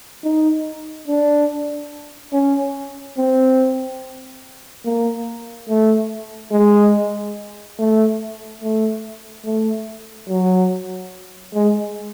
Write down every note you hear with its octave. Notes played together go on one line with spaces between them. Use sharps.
D#4
D4
C#4
C4
A#3
A3
G#3
A3
A3
A3
F#3
G#3